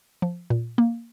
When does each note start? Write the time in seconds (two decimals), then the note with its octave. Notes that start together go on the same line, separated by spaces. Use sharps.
0.22 F3
0.50 A#2
0.78 A#3